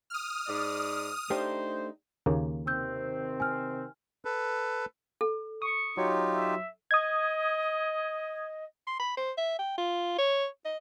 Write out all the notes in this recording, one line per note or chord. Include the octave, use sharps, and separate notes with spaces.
D#6 F6
G#2 D5
A3 D4 D#4 G4 C5
D#2 C#3 A#3
C3 D#3 C4 E6 G6
G#5 F6
A4 B4
A4
C#6 D#6
F#3 D#4 F4 G4 C#5
E5
D#5 D#6 G#6
C6
B5
C5
E5
G5
F4
C#5
D#5